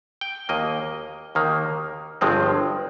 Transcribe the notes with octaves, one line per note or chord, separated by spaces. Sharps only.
G5
D#2 D#3 A#3 D#5
D#2 D#3 A#3
G1 G2 F3 G#3 C4